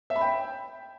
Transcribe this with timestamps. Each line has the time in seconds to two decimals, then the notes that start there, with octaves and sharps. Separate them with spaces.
0.10 E5
0.16 B5
0.21 G5